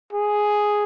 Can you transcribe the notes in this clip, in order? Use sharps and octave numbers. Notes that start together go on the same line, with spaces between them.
G#4